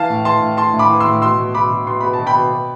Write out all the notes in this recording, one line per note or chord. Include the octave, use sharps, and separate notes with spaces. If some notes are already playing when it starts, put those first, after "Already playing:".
Already playing: E3 F5 A5
A2
E3 A5 C6
A2
E3 A5 C6
A2
B5 D6
E3
C6 E6
A2
B2 C6 E6
B2
B2 B5 D6
B2
B2 C6
B2 B5
A5
B2
G5 B5
B2
B2